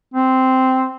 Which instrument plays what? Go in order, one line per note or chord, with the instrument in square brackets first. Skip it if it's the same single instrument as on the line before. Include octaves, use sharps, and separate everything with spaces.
[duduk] C4